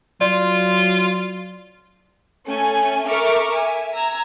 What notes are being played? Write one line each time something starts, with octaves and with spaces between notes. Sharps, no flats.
F#3 F4 D5 C6
A3 C#4 G#5
A4 A#4 E5 C#6 D6 F6
E5 G#5
A#5 E6 G#6